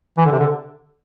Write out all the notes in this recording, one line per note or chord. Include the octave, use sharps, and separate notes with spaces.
E3
D3
C3
D3